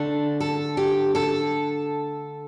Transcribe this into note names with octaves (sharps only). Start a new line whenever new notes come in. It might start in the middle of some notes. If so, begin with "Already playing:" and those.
Already playing: D3 A3 D4 A4
A4
G4
A4